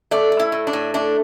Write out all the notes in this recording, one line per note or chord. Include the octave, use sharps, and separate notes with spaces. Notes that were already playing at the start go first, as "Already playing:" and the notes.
A3 D5
A3
E4
A2
D4
A2
A3 D4